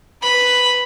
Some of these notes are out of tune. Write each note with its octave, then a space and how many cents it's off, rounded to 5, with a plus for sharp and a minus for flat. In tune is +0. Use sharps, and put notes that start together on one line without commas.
B4 +5 B5 +0